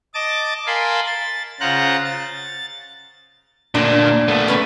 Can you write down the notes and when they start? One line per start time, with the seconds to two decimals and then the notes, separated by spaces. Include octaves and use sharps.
0.14 D#5 A5 D6 A6
0.67 A#4 F5 G#5 A5 B5 C6
1.06 A6
1.60 C#3 F4 C5 F#5 A#5 F#6
2.05 A6
3.75 D2 A#2 D4
4.28 A3 B3
4.48 C#4 B4